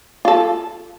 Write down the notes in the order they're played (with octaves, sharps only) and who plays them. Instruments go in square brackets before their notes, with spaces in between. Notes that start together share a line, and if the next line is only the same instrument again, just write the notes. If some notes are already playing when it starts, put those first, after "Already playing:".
[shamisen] F4 A4